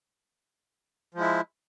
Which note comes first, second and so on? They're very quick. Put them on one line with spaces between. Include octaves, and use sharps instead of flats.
F3 G#3 E4